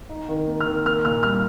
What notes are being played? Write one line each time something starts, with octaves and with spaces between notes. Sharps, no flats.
D#4
D#3
A#3
F6
D#3
A#3 F6
A#2 F6
G3 F6